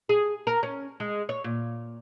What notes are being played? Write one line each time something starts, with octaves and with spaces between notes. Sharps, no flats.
G#4
A#4
C#4
G#3
C#5
A#2